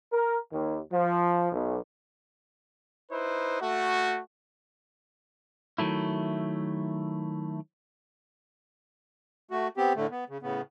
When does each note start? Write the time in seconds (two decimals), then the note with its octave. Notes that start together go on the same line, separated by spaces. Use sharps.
0.11 A#4
0.51 D#2
0.91 F3
1.52 B1
3.12 D#4 E4 B4 C5
3.62 A3 F#4
5.78 D#3 F#3 A3 E4
9.51 A3 F#4
9.77 B3 C4 G4
9.96 A2 D3 A3
10.11 B3
10.29 C#3
10.42 A2 C#3 B3